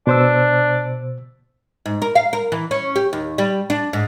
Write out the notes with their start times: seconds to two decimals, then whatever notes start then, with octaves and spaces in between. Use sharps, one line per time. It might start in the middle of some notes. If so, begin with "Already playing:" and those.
0.07 B2 D4 C5 E6
1.86 G#2
2.02 A#4
2.15 F5
2.33 A#4
2.52 E3
2.71 C#4
2.96 G4
3.13 D#2
3.38 G3
3.70 D4
3.93 G#2